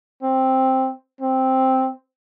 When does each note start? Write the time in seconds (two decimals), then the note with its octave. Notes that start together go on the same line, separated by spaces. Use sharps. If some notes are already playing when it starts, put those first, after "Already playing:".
0.23 C4
1.21 C4